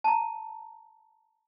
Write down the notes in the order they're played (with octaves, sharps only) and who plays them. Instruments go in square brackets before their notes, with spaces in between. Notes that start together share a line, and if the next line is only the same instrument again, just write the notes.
[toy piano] A5 A#5